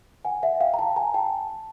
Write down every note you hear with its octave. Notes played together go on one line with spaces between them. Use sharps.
F#5 G#5
E5 F#5
F5 G5
A#5
G5 A5
G#5 A#5
G5 A5